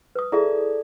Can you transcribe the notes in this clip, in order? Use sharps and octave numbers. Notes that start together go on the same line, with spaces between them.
B4 D#6
E4 G#4 A4 D5 E5